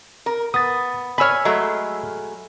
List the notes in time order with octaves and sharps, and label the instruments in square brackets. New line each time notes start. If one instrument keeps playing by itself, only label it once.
[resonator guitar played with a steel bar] A#4
[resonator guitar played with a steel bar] B3 [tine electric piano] D#6 A6
[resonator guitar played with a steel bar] C#5 G#5 [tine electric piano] B5 E6 F6
[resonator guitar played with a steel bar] F#3 G#3 A3